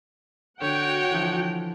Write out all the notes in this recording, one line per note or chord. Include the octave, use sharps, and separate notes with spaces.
D3 F#4 C#5 F#5 G5
D3 E3 F3